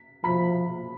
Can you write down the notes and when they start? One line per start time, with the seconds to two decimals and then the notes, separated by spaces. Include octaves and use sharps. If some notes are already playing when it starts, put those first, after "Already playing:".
Already playing: B6
0.24 F3 B5 B6